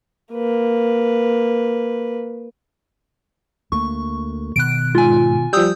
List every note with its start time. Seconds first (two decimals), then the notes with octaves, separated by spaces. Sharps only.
0.34 A#3 B4
3.72 D2 A3 A#3 C#6
4.56 B2 D#3 F#6 D7
4.95 G#2 F4 G#5
5.53 F3 G3 D#6 E6 G6